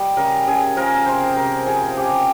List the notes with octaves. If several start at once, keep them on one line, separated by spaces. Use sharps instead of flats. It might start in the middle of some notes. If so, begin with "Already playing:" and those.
Already playing: G3 D#5
C#3 A#4
C#3 G#4
F3 A#4
C3 C5
C3 A#4
F3 G#4
C#3 G4